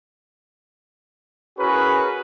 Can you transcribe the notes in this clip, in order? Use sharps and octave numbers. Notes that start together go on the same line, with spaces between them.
C#4 E4 F#4 G#4 A#4 B4